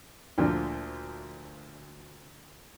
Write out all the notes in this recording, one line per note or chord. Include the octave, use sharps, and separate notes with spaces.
D2 A#2 D3 F3